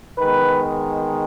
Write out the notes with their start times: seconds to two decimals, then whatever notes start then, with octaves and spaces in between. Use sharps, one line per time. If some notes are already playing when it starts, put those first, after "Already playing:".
0.19 D#3 G#3 B3 B4